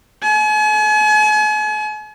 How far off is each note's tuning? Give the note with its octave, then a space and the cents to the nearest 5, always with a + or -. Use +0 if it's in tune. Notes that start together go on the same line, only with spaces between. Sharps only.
G#5 +40